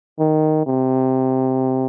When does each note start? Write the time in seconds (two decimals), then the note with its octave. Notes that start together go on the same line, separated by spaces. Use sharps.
0.19 D#3
0.66 C3